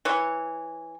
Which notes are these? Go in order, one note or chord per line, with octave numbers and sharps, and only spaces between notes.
E3 C#5